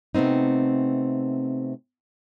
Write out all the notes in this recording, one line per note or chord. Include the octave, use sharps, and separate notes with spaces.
C3 A3 B3 C4 D#4